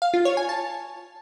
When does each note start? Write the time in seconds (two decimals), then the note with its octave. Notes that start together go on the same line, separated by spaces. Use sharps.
0.02 F5
0.14 F4
0.25 C#5
0.37 G#5
0.49 A5